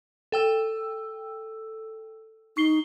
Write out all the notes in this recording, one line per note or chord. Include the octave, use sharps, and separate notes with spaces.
A4 G5 E6
D#4 C#6 C7 G7